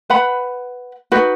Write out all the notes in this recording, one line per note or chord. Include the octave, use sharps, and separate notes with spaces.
B4 F#5 B5
D#4 F#4 B4